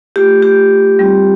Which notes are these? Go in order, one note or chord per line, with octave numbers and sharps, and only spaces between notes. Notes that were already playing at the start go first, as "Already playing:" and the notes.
A3 F4 G4
G4
G3 C4 F4